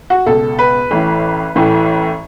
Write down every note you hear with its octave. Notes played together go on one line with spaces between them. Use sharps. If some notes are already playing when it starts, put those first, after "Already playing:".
F#4
C#2 B2 A4
B4
A1 A2 E3
A1 A2 E3